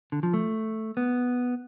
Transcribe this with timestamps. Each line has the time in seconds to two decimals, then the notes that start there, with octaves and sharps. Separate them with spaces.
0.12 D3
0.23 F3
0.34 A3
0.97 B3